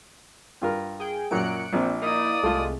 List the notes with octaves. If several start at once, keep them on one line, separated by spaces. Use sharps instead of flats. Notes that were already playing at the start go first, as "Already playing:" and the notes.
G2 F4 A#4
G#4 G5
F#2 A#2 F#3 F#6 C#7 D7
A#1 C4 D4
A#3 D#4 E4 D5 D#6
C2 G#3 A3 F4